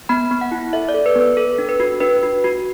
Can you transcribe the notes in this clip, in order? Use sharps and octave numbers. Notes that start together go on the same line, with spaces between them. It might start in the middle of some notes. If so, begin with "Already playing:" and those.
B3 B5
B3
F#5
E4
A4 E5
D5
A4
B4
B3
B4
A4
D4
B4
F#4
D4 B4
F#4
F#4